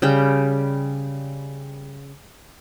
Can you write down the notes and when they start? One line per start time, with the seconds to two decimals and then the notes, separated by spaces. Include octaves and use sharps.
0.02 C#3 G3 G5